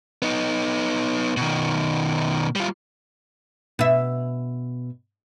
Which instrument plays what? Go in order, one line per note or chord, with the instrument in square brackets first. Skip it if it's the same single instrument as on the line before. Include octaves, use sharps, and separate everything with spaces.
[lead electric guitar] B3 D#4
B2 D#3
G3 F4
[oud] B2 E5